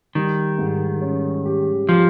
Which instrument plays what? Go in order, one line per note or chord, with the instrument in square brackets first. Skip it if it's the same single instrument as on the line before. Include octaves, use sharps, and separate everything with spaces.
[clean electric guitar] D#3 [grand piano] G3
[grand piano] G#2
C#4
G4
[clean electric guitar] F3 [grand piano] G4